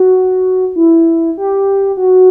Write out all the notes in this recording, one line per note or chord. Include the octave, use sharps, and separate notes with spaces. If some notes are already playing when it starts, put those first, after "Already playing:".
Already playing: F#4
E4
G4
F#4